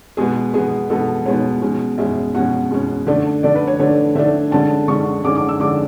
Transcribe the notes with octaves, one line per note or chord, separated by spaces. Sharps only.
B2 G#3 B3 G#4
B2 G#3 B3 G#4
B2 G#3 B3 A4
B2 G#3 B3 C#5
B2 G#3 C#4
B2 G#3 C#4 E5
B2 G#3 C#4 F#5
B2 G#3 C#4
D3 A3 D4
D3 A3 D4 D5
B4
C#5
D3 A3 D4 C#5
D3 A3 D4 E5
D3 G#3 C#4 A5
D3 G#3 C#4 C#6
D3 G#3 C#4 D6
D6
E6
D3 G#3 C#4 D6